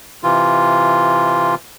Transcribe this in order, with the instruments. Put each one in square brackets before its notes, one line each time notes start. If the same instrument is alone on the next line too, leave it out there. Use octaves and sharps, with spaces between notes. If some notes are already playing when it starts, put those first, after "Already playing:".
[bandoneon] C3 E3 F4